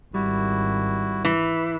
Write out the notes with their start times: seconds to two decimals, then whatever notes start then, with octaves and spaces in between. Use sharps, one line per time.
0.14 G#1 G3 E4 F#4
1.25 E3